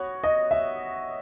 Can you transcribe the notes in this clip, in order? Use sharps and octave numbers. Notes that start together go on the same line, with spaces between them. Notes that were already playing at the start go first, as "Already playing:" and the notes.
Already playing: B3 F#4 C#5
D#5
E5